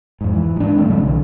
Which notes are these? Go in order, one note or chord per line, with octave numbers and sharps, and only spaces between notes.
F2 G#2
E3
G#2 D4
D#3 G3 A3 C4
C#3 F#3 G3 D4
B1 D3 E3